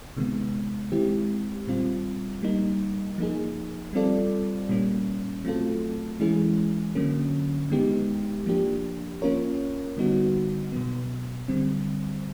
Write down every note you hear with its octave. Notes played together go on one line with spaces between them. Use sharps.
C3 D#3 G#3 B3
D#3 G#3 C4 E4 G4
A#2 G3 C4 F4
G3 A#3 D#4
F3 A#3 D#4 G#4
G3 C4 F4 A4 D5
A#2 G3 A#3 C#4
F#3 A3 C4 F4 A4
E3 G#3 C#4 E4 G#4
D3 F#3 A#3 C#4
D#3 G#3 B3 D#4 G4
F3 A#3 D4 G4
A#3 C#4 F4 A#4 C#5
D3 G3 B3 D#4 F#4
B2 F#3 B3
D3 G3 C4